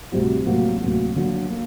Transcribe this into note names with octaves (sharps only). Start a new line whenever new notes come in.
D2 C3 G3 C4 F#4
D2 C3 F#3 A#3 F#4
D2 C3 F#3 A#3 F#4
D3 F#3 A#3
A#3